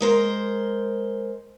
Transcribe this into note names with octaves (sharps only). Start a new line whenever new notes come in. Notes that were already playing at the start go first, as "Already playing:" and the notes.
G#3 A#4 C5